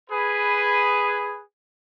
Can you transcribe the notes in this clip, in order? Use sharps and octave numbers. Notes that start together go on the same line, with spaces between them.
G#4 B4